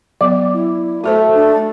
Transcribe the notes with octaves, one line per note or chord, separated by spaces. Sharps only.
F#3 B3 D5
E4
A3 F#4 A4 C5
D4